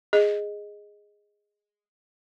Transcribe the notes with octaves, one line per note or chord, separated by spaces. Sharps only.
G#4 D#5